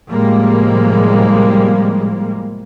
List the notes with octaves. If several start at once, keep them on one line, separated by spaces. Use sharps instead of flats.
A2 C3 F3 G3 G#3 A#3